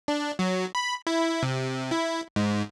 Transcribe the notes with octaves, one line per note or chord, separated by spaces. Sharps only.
D4
F#3
B5
E4
C3
E4
G#2